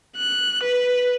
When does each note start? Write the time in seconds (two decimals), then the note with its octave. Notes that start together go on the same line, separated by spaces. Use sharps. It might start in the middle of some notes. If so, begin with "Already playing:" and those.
0.17 F#6
0.63 B4